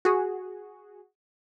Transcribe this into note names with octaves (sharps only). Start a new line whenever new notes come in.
F#4 G#4